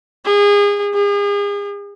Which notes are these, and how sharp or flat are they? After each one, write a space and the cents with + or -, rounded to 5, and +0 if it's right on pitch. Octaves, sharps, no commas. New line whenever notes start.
G#4 -30
G#4 -40